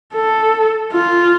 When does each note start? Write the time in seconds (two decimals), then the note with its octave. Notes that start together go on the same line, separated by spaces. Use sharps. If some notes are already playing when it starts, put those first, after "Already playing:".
0.15 A4
0.92 F4